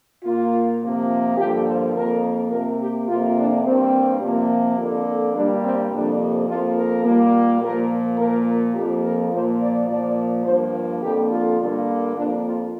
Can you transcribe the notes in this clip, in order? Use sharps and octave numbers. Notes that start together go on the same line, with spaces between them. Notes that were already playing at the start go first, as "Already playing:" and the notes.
A#2 A#3 F4
C3 F3 A#3
G2 D3 F3 A#3 G4
C5
F2 F3 A#3 A#4
C3 A#3 A#4
G4
F2 C3 A#3 F4
D4
G2 G3 A#3 C4
C3 F3 A#3
F2 D3 A#3
G2 G3 A#3 D4
C4
F2 C3 F3 A#3 D4
F2 F3 A#3 F4
A#4
A#2 G3 A#3
A#2 F3 A#3 A#4
A#2 F3 A#3 A#4
F2 F3 A#3 G4
A#4
A#2 F3 A#3 C5
D5
A#2 F3 A#3 D5
G2 F3 A#3 C5
F2 D3 A#3 G4
F4
G2 D3 A#3
F2 F3 A#3 D4
F4